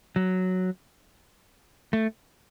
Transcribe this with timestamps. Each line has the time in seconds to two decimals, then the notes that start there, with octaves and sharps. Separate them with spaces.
0.16 F#3
1.93 A3